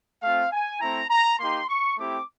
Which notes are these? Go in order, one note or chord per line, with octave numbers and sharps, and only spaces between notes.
A3 C4 F4 F5
G#5
A3 C4 E4 A#5
A#5
A#3 D#4 G4 C6
C#6
A3 C4 E4 G4 D6